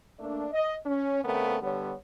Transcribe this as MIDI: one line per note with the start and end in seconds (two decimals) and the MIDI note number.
0.19 0.46 57
0.19 0.46 58
0.19 0.46 62
0.52 0.74 75
0.86 1.21 61
1.24 1.57 49
1.24 1.57 57
1.24 1.57 59
1.24 1.57 60
1.24 1.57 70
1.62 1.93 50
1.62 1.93 55
1.62 1.93 59
1.62 1.93 73